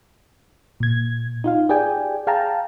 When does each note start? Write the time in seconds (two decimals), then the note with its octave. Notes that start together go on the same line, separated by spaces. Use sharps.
0.80 A#2 G#6
1.44 D#4 F4 F5
1.69 G4 G#4 D5 G5 G#5
2.27 G#4 F5 G5 A5 A#5